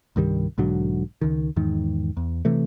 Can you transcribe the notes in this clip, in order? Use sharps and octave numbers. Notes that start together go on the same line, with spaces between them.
C2 G2 D#3 G3
B1 G#2 D3 F#3
C#2 D#3
E2 G#2 D#3
E2
C3 E3 A3